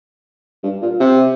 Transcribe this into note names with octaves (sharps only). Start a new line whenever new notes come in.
G2
A#2
C3